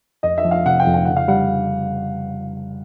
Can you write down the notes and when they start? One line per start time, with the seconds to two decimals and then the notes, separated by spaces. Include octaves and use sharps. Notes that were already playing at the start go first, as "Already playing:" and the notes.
0.23 F2 D#5
0.38 E5
0.45 F3
0.51 F5
0.66 C3 F#5
0.80 G5
0.87 F2
0.94 G5
1.05 C#3 F#5
1.16 F5
1.28 G3 F#5